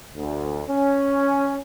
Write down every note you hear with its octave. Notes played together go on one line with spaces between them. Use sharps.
D2
C#4